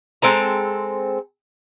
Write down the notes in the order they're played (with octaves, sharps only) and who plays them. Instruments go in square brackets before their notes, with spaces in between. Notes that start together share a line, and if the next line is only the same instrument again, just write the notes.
[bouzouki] G#3 C4 A4 A#5